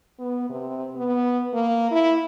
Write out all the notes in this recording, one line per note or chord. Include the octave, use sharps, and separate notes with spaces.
B3
C3
B3
A#3
E4